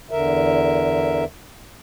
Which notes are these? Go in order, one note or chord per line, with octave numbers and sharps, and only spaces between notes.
E2 D3 A#4 E5